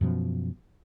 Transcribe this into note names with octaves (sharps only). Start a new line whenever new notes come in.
F#2 B2 F3